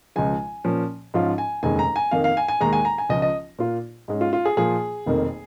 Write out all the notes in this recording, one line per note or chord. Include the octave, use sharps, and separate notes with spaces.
C#2 C#3 F3 G#3 G#5
A#2 F3 C#4
G#2 F3 C#4 F4
G#5
F1 D#2 C#3 G#3 G#5
A#5
G#5
F2 D#3 A#3 F5
F5
G#5
G#5
D#2 D#3 G#3 A#5
G#5
A#5
G#5
C#2 C#3 F3 D#5
D#5
A#2 A#3 F4
G#2 G#3 C#4
F4
F4
G#4
A#2 F3 A#3 F4 G#4
F1 F2 D#3 A#3